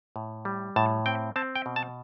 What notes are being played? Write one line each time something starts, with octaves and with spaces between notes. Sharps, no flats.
A2
G3
A2 A5
C4 G5
C4 A5
G5
B2
A5